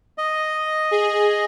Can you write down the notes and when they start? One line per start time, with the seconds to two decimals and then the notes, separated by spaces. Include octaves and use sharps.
0.18 D#5
0.91 G#4